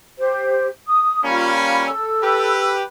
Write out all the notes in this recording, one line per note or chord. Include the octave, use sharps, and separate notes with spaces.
G4 C5
D#6
G3 A#3 C#4 F4 B5
A4 E6
G4 B4